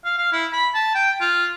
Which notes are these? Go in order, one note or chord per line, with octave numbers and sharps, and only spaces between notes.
F5
F5
E4
B5
A5
G5
F4